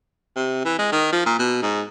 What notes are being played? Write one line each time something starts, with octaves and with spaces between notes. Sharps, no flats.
C3
E3
G#3
D#3
F3
A#2
B2
G#2